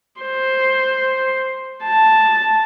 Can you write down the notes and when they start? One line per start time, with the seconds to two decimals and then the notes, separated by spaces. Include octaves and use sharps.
0.21 C5
1.84 A5